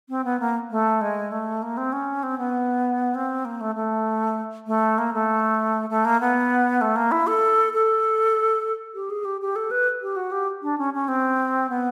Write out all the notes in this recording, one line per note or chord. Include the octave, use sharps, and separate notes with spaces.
C4
B3
A#3
A3
G#3
A3
A#3
C4
C#4
C4
B3
C4
A#3
A3
A3
A3
A#3
A3
A3
A#3
B3
A3
A#3
E4
A4
A4
G4
G#4
G4
G4
A4
B4
G4
F#4
G4
D4
C#4
C#4
C4
B3